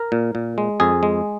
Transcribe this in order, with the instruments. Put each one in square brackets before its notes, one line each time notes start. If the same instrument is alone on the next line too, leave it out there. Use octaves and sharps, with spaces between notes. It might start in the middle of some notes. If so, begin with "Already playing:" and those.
Already playing: [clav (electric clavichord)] A#4
A#2
A#2
G#3
F2 G#4
G#3